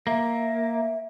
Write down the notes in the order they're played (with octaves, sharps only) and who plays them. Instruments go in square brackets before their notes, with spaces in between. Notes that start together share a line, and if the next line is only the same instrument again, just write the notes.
[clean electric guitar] A#3 [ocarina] E5